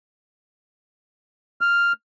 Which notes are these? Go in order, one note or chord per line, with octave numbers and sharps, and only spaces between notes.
F6